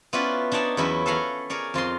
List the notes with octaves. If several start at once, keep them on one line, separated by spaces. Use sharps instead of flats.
B3 C#4 E4 F4 B4 D5
D4 D#4 C#5 D5 A5
E2 F#3 C#4 E4 B4 E5
A4 B4 C#5 F5 F#5 A#5
G#4 A#4 C#5 D5
F2 F4 D#5 C6